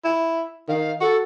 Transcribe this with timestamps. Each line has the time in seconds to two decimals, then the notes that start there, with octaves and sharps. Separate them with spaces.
0.04 E4
0.68 D#3 F5
1.01 F#4 A4